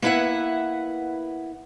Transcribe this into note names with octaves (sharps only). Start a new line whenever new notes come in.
A#3 B3 E4 B4 E5 F#5